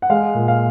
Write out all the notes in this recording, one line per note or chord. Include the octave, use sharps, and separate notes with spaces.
F#5
G#3 F5
A#2
F5